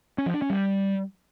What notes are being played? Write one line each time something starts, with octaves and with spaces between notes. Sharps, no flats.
C#4
F3
D4
C#4
G3